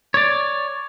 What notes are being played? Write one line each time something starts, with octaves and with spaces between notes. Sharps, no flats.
C#5 D5